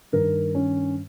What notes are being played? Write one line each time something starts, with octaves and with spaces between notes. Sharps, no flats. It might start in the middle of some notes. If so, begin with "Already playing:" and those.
G2 D#3 A#4
C#4